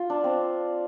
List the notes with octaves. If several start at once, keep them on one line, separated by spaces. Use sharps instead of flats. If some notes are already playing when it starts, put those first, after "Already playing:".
Already playing: F4
D4
C4